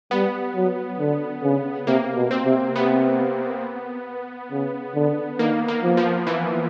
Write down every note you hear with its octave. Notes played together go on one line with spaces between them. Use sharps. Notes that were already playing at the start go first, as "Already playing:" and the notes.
G3 B3
F#3
D3
C#3
C3 A#3
B2
C4
C3
C3 B3
C#3
D3
D#3 A#3
A#3
F3
F3
E3